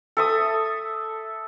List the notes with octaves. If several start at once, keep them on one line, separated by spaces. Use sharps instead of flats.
A4 E5 D#6